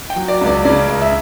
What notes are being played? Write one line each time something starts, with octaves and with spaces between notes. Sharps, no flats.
G5
F#3
D5
C#2
D5
C#3 D5
C#2
E5